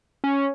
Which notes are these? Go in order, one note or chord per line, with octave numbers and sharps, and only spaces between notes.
C#4